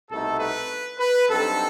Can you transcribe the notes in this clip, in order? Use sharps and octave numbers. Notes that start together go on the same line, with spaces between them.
C2 B2 A3 D#4 A4
B4
B4
G2 F#3 C4 D#4 A4